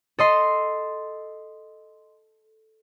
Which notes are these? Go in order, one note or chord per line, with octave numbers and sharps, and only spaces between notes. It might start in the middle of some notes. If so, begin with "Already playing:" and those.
A4 D#5 C6